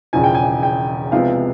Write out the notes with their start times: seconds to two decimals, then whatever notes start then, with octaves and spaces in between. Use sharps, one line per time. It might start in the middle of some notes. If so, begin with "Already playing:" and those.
0.13 E1 E2 C#3 F3 G#5
0.24 G5
0.35 G#5
0.63 G5
1.12 C2 C3 F3 G#3 B3 F5